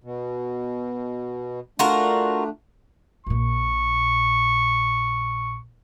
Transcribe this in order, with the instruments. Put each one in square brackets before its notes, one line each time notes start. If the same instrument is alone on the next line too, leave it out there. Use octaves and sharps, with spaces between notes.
[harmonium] B2
[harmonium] A3 D4 [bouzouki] F4 F#4 A#4
[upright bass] A#1 A#2 [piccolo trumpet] C#6